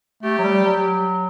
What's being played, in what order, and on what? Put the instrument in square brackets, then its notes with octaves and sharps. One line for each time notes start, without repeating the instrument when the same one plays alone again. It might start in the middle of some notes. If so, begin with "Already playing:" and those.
[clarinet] A3 [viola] G4
[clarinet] F#3
G3
F#3